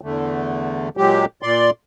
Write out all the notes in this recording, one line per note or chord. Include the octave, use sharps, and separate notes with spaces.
E2 D3 A3
A#2 F#3 G#3 G4
A#2 D5 C6